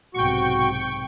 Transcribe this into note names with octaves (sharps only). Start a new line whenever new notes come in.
B1 G#2 C3 F#4 G5 C#6